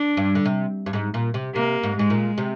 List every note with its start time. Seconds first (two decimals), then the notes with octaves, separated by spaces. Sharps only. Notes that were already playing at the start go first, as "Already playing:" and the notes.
Already playing: D4
0.17 G2
0.35 D3
0.46 C3
0.86 G2
0.93 G#2
1.14 A#2
1.34 C3
1.55 C3 A#3
1.83 G#2
1.97 G#2 G#3
2.10 A#2
2.38 C3